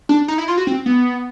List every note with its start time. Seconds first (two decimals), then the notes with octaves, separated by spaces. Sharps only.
0.09 D4
0.28 D#4
0.38 E4
0.48 F4
0.58 F#4
0.67 C4
0.86 B3